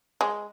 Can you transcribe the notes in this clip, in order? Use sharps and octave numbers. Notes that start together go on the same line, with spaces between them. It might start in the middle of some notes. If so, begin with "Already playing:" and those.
G#3